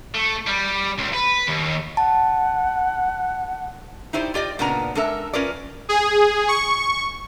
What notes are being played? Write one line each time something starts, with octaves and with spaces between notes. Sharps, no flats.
A3
G3
C#2
B4
D#2
F#5 A5
D#4 E4 G4 C5 D5
F4 G4 D5 D#5
A#2 C#3 B3 D4 A#4 A#5
G#3 D4 A4 A#4 E5
C#4 F4 A#4 B4 D5
G#4
C#6